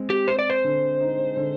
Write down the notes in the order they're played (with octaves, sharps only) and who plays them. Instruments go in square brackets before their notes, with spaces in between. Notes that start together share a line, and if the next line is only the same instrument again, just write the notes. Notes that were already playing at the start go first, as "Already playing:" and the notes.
Already playing: [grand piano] G#3 C4
[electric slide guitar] G4
[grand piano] C4 [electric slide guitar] C5
[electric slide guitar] D5
C5
[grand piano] D3
D#4
D3